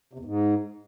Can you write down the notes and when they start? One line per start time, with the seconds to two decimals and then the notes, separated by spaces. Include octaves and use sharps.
0.13 C3
0.19 E2
0.25 G#2